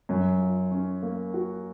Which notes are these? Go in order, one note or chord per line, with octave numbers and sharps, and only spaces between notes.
F#2 F#3
F4
C#4
A#3
F#4